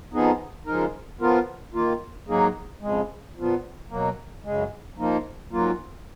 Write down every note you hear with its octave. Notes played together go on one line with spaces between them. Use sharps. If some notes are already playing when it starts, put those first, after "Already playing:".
F2 F3 B3 D#4 G#4
C#3 F3 G#3 D#4 A#4
F3 B3 F4 A#4
D#3 A#3 F4
G#2 F#3 A#3 D#4 G#4
F2 C#3 G#3
A#2 F3 B3
B2 F#3 A#3
F#2 C#3 G#3
F3 A#3 D#4
G#2 F#3 A#3 F4